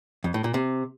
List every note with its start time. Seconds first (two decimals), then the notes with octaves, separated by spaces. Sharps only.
0.24 F2
0.34 A2
0.44 A#2
0.54 C3